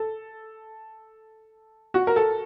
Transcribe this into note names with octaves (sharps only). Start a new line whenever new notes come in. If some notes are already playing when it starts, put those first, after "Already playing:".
Already playing: A4
F#4
A#4
A4